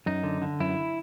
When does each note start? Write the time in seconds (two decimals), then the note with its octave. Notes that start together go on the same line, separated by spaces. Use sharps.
0.06 F#2 D#4
0.23 D3
0.42 D3
0.60 F#2 E4